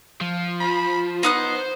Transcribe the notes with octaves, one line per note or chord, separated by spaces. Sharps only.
F3
B5
B3 D#4 C5 D#6 F#6